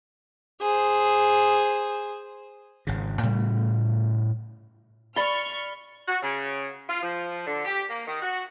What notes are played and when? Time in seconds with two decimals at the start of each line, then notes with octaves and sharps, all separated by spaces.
0.62 G#4 C5
2.87 G#1 C#3
3.23 A2 C#3 G3 A3
5.16 D5 B5 C#6 F6 A6 G7
6.07 F#4
6.21 C#3
6.88 F4
7.02 F3
7.45 D3
7.64 G4
7.88 A#3
8.06 D#3
8.21 F#4